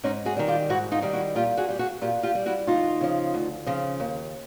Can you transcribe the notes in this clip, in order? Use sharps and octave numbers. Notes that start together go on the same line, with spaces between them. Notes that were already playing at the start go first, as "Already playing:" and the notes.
G#2 C#4 D#4
F#4 G#4
D#3 G3
F4 G4
G#2 E4 F#4
D#4 F4
D#3 G3
E4 F#4
A#2 F4 G4
F#4 G#4
G3 G4
F#4 G#4
A#2 F4 G4
F4 G4
G3
E4 F#4
D2 D#4 F4
C#3 F3
D2
C#3 F3
D#2